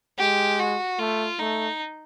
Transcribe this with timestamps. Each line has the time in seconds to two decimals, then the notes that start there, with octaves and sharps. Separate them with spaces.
0.19 G#3 G4
0.60 F#4
0.99 A3 F4
1.39 A3 D#4